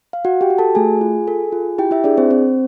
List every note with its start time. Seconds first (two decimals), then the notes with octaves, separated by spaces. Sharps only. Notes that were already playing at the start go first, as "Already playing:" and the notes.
0.13 F5
0.25 F#4 F#5
0.41 G4 G5
0.50 F#4
0.58 A4 A5
0.75 A3 G#4 G#5
1.01 F4
1.28 A4
1.52 F4
1.78 E4 G4 G5
1.91 E4 E5
2.04 D4 G#4 D5
2.18 C4 C5
2.31 C4 C5